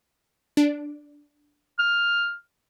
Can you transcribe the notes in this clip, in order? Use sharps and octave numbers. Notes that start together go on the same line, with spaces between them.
D4 D7
F6